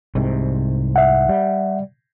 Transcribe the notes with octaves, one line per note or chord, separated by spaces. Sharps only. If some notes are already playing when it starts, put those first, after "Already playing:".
C2 G#2 C3
E5 F#5
G3